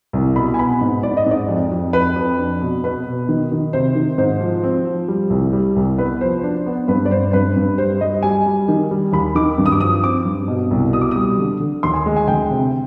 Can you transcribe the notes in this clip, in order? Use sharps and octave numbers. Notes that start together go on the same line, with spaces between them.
C2
B2 B5
G#5
B3 B5
G#2
G#2 D5
D#5
G#2 D5
F2
F2
F2 B4
F2
D4
B2
B2 B4
B2
D#3
D#3
C3 C5
D#3
G#2 C5
F3
C4
F3
G3
C2
G3
C2
B3 B4
F3 C5
D4
B3
G2 B4
D5
G2 C5
G2 B4
G2
G3 C5
G3 D#5
G3 G#5
G3
D#3
G3
D#2 B5
D#3 D6
G2
D#6
D6
F3 D#6
C4 D6
G2
B2
C2
B2 D#6
D6
G3 D#6
D3
D3
D#2 C6
G#5
G#3
G#5
D2 G5
C3